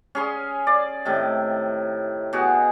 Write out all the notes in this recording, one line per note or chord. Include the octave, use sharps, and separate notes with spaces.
C#4 G#4 C6
D5
A2 C3 D#3
B2 F#4 G#4